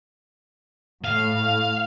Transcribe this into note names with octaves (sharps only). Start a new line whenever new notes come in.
A2 F5